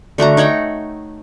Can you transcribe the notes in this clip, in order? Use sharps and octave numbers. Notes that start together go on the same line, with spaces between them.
D3 A3 F#4 A#5
D#4 C#5 F#5 G5